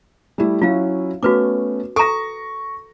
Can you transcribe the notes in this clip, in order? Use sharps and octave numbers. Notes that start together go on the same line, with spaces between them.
G3 A3 E4
F#3 C#4 E4 F4 F5
A3 B3 C#4 F#4 B4 D6
A4 A#5 C#6 A#6